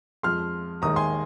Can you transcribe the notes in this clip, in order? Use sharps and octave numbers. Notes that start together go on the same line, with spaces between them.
F2 F3 G#3 C6 F6
D#2 D#3 G#3 A#5 D#6
G#5 C6